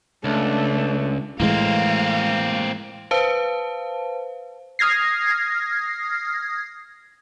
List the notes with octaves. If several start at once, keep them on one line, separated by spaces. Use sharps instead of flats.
C#2 A3 D4
A2 E3 G#3 A#3 C4 F5
B4 C5 F5 A5
D#6 F6 G#6 A#6 C7